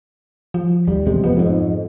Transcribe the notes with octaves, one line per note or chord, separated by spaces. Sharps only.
F3
D#2 G3
E1 C3 G#3
F1 F3 B3
F2 G#2